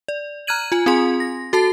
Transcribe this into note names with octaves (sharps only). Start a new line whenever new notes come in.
D5
A#5 F6 F#6 G#6 D#7 F#7
F4 G#5
C4 F4 G#4 G#5 C6
A#6
F#4 A4 A5 A6 C7